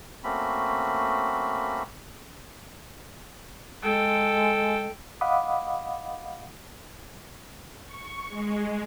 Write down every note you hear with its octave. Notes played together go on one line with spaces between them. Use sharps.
A3 A#3 C4 C#4 F#4 B5
G#3 A4 G5
D#5 F5 F#5 B5 D6 D#6
C#6
G#3